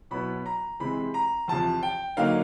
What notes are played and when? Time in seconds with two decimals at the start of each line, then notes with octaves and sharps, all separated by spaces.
0.11 B2 F#3 B3 E4 B5
0.46 A#5
0.80 C3 E3 G#3 C4 B5
1.14 A#5
1.48 E2 C3 F3 A5
1.83 G5
2.17 D3 F#3 A#3 D#4 F5